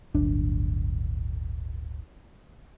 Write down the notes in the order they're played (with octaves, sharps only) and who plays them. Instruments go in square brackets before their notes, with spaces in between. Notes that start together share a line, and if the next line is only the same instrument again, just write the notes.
[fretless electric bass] D1 G1 D4